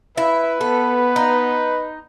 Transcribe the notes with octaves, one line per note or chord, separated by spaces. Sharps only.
E4 B4 E5
B3 A4
D#4